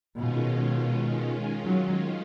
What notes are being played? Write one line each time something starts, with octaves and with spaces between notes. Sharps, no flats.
B2 D#3 G#3 C#4 F4
F#3